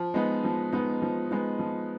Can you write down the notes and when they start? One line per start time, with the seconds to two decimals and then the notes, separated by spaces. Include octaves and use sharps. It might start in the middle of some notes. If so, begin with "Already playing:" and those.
Already playing: F3
0.14 G#3 B3 D#4
0.44 F3
0.73 G#3 B3 D#4
1.02 F3
1.31 G#3 B3 D#4
1.59 F3